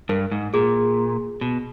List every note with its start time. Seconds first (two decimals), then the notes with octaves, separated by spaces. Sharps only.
0.09 G2 A#4
0.31 G#2
0.54 A#2 G#4
1.41 B2